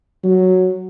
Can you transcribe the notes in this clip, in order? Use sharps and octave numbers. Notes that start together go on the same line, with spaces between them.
F#3